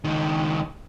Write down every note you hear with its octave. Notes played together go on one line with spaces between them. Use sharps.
C#2 D#3